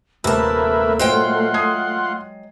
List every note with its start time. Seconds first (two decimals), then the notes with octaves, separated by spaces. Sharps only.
0.24 D#1 C3 A3 A#3 G4 B4 E5 A5
0.99 A#2 F#3 G#3 F4 C5 F#5 G5 C6
1.54 D#6 G#6 C7